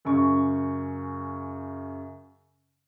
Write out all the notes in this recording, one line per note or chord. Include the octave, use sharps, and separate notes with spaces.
F#2 C#3 C#6